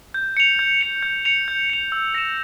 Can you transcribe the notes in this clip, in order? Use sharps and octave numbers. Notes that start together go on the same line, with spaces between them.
G6
C#7 F7
G6
C#7 F7
G6
C#7 F7
G6
C#7 F7
E6
A#6 C#7 E7